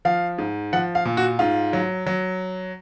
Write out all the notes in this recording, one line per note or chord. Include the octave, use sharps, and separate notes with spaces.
F3 F5
G#2
F3 F#5
F5
A#2
F#4
G#2 F4
F#3
F#3